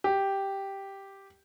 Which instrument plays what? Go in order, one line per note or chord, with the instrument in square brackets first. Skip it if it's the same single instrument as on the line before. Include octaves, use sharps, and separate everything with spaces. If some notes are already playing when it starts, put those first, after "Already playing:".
[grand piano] G4